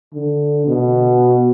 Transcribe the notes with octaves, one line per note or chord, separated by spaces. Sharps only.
D3
B2